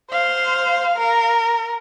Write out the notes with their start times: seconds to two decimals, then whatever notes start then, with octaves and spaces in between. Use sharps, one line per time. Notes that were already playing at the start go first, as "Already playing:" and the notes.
0.11 C5 F5
0.97 A#4